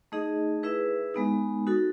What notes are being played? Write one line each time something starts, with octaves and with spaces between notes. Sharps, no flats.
A3 D#4 G#4 D#5
E4 G#4 B4 E5
G#3 B3 D#4
D#4 F#4 A4